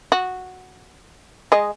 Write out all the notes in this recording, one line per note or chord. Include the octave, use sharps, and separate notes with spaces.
F#4
G#3 D#5